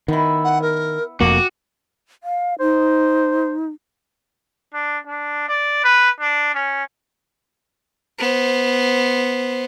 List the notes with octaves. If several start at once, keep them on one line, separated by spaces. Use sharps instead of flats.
D#3 B3 E4
F#5
A#4
F1 F2 A#3 F#4 G5 D6
F5
D#4 C5
D4
D4
D5
B4
D4
C#4
B3 C5